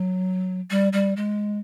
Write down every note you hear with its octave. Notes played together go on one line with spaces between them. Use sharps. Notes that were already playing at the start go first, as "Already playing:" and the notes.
Already playing: F#3
G3
G3
G#3